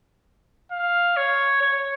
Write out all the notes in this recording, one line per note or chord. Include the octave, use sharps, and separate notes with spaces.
F5
C#5
C#5